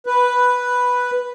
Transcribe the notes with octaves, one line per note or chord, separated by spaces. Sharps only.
B4